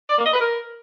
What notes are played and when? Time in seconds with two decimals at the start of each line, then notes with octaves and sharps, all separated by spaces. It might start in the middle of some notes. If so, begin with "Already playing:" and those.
0.10 D5
0.17 A#3
0.25 D#5
0.33 B4
0.40 A#4